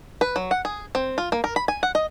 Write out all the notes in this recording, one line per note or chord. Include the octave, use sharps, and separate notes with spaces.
B4
F#3
F#5
G#4
C4
F4
A#3
A#4
B5
G#5
F#5
D#5